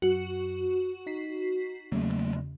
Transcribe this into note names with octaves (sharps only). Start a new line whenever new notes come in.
F#2 F#4
D#4 B6 C7
E2 C#3 F#3 A3 A#3